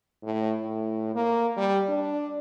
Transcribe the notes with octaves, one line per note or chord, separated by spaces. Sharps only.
A2
A2
A#3
G3
D4